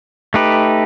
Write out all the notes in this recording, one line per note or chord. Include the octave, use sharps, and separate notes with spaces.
A3 D#4 G4 B4